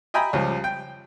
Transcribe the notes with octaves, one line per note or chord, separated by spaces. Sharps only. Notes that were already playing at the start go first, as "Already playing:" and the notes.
D#5 E5 G5 G#5 A#5 B5
C#2 F3 G3
G5